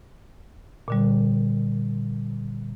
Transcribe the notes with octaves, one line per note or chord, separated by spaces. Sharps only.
A#2 D3 G3